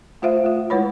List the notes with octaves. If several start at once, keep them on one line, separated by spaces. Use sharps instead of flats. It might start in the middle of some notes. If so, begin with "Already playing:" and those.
A3 F4 C5 E5 F5
A3 F4
G#3 E4 B4 C#5 B5